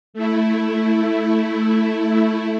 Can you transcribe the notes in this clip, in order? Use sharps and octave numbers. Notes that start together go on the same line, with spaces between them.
A3 E4